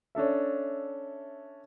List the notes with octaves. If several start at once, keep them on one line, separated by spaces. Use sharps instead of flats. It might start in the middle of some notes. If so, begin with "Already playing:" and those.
C#4 D4 A4 E5